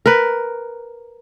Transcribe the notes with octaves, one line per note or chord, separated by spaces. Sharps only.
A#4 B4